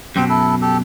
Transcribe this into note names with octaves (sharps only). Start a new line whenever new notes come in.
F#2 B2 C4 G4 C5
E4 A4
G4 A4